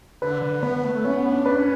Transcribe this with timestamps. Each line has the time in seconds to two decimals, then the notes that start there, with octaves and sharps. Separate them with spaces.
0.22 D3 B4
0.42 D3
0.63 B3 B4
0.84 A3
0.95 A3
1.04 B3 C#4
1.32 D4
1.46 B4
1.59 C#4